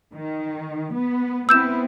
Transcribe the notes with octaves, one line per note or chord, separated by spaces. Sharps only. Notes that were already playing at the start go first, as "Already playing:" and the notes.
D#3
B3
B3 C4 E4 E6 G6 E7